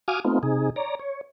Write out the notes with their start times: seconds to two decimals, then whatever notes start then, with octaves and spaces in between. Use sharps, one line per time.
0.08 F#4 F5 G#5 D6 D#6 F6
0.25 A3 B3 C4 D#4 F4
0.43 C3 D#4 G#4
0.76 C#5 D5 A#5
0.99 C#5